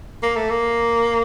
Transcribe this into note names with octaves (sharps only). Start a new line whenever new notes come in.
A#3
A3
A#3